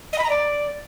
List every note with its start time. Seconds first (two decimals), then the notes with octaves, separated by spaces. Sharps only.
0.13 D#5
0.18 B5
0.24 A#5
0.29 D5